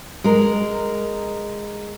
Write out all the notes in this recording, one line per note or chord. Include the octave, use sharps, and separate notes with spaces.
G#3 A#4